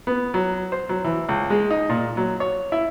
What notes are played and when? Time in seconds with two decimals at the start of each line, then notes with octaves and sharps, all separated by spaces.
0.07 B3
0.34 F#3
0.72 C5
0.89 F#3
1.04 E3
1.29 C#2
1.50 G#3
1.70 D#4
1.89 A#2
2.17 F#3
2.40 C#5
2.72 E4